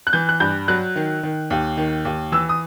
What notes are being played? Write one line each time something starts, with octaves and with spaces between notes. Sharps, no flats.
F#6
E3 G6
F#6
G2 G6
F#3 F#6
D#3
D#3
D#2
D#3
D#2
E3 E6
D#6